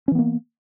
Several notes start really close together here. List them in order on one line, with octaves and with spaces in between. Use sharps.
C#4 E3 B3 A#3